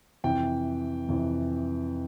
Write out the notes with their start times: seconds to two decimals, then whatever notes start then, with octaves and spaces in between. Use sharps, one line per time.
0.24 F2 C3 E3 G5
1.08 F2 C3 E3